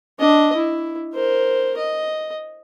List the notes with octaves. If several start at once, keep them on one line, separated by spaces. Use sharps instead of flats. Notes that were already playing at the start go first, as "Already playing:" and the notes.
D4 D#5
E4
A#4 C5
D#5